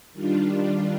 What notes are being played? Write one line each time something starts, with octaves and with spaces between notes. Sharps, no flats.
D#3 G3 D4 F4